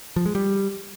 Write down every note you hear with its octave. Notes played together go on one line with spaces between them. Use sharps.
F3
G#3
G3